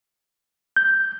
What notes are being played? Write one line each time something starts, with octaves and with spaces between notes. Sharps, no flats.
G6